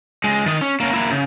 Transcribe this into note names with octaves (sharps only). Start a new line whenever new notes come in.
C#2 G#3
D#3 D#5
C#4
A#3 C#4
A#3 E4
C#3